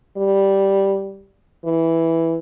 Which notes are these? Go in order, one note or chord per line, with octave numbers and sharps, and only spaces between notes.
G3
E3